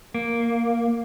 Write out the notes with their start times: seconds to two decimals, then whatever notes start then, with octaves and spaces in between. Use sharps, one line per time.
0.14 A#3